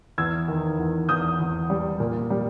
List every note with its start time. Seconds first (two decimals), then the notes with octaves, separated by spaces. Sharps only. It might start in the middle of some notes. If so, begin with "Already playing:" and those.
0.18 E2 E6 G#6
0.48 D#3
0.78 E2
1.09 E2 D#6 G6
1.40 E2
1.70 G3
2.00 A#2
2.30 G3